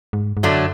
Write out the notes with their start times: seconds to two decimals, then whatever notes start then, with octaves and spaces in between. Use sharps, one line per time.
0.13 G#2
0.37 G#2
0.43 F#2 D3 F#3 A3 D4